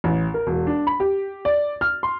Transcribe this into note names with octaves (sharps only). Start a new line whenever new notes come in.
A1
A#4
E1
D4
B5
G4
D5
F6
C6